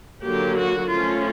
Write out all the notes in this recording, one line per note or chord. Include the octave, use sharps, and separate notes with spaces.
D3 F#3 A#3 G4
F#4
F3 A3 C#4 F4